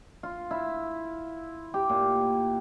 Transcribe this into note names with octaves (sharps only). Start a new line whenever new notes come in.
F4
E4
G4
A#2